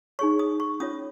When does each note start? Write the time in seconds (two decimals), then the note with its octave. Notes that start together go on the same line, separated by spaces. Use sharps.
0.19 D#4 G#4 C#5 C#6
0.39 D#6
0.60 C#6
0.80 C#4 F4 C#5 D#6